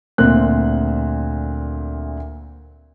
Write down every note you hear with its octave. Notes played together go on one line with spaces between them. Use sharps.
D2 A#2 C4 F#6